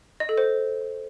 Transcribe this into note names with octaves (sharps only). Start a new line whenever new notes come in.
D#5
A4
C5